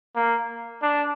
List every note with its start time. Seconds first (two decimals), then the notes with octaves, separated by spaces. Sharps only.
0.16 A#3
0.83 D4